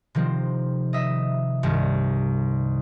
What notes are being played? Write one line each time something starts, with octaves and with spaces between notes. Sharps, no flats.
C3 D#3 F3 C4
D#5 E5
C2 G2 D#3